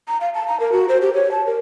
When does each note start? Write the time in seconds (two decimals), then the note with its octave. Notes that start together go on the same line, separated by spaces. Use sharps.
0.08 A#5
0.21 F5
0.35 A5
0.48 A#5
0.60 A#4
0.72 F#4
0.89 C5
1.02 G4
1.14 C#5
1.32 A5
1.46 A#4